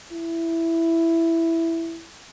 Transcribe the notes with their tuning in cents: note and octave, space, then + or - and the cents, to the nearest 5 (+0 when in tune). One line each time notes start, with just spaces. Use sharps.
E4 +5